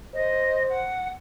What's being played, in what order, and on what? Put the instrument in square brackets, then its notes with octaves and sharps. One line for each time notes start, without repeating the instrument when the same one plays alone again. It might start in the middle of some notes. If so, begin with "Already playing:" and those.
[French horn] C5 [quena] D#5
[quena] F#5